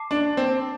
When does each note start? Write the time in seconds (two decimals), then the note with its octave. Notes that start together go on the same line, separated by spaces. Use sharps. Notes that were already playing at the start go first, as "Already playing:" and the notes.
Already playing: A5 D6 C7
0.11 D4
0.37 C4